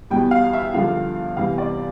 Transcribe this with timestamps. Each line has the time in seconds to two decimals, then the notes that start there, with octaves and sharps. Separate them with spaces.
0.10 E2 B2 G3 G5
0.31 F5
0.53 E5
0.74 G2 D3 F3 F5
1.37 E2 C3 E3 G3 F5
1.58 D5